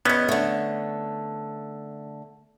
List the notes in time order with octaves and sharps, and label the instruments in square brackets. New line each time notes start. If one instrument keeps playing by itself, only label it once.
[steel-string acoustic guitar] E2 D#5 [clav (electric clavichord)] B3 C#4
[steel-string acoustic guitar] D3 A3